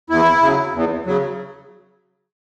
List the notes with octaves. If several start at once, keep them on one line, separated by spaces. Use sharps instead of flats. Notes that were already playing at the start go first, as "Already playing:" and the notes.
E2 E4
C#3 F#3
E2
C#3 F#3